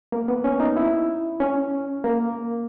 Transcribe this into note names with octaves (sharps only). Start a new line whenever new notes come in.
A#3
B3
C#4
D#4
E4
C#4
A#3